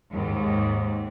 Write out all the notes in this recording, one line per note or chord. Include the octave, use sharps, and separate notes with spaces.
D#2 G#2